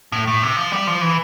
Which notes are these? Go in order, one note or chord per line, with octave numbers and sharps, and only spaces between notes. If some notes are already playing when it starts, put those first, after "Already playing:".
A2
A2
C3
F3
G3
F3
E3